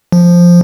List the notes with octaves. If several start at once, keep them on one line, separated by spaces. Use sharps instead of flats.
F3